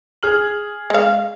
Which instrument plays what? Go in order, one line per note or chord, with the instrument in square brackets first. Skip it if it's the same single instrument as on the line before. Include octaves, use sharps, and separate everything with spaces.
[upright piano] G#4 F6 F#7
[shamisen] G#3 F5